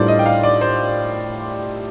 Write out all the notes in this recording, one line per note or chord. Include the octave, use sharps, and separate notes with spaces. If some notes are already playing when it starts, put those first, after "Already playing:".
Already playing: A2 G3 D4 F4 A4 A#4 C5 D5
D#5
G5
F5
D5
C5